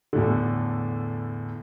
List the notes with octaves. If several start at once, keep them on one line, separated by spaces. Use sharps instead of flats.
E2 A2 D3